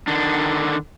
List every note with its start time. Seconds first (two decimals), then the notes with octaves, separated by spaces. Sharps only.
0.08 D3 D#3 D4